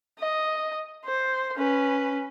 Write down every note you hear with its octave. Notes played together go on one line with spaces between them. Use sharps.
D#5
C5
C#4 B4